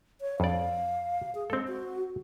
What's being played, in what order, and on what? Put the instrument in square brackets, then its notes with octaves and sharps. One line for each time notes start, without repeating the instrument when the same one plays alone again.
[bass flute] C#5
[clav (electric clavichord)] F2 D5 [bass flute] F5
[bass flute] G#4
[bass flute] G#3 [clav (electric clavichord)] C4 A4
[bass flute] F#4